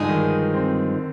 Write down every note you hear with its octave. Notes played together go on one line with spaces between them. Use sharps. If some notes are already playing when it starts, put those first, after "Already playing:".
Already playing: G2 D3 F3 G#3 D#4 G#4
D#3
C4